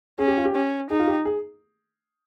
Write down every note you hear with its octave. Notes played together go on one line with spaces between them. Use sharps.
C#4 G#4
G4
F4
G4
C#4
D#4 G#4
F4
G4
G#4